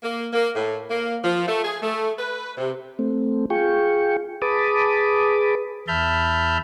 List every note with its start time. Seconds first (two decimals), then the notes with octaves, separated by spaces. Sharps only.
0.03 A#3
0.33 A#3
0.55 A2
0.90 A#3
1.24 F3
1.48 A3
1.64 G#4
1.82 A3
2.19 B4
2.57 C3
2.99 A3 C4
3.50 F4 G#4 G5 C#6
4.42 G#4 B4 A5 B5 D6 D#6
5.88 E2 E5 A5 B5 F6 G6